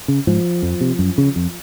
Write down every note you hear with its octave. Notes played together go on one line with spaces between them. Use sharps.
C#3
G#2 F3
F2
C3
F#2
C#3
F2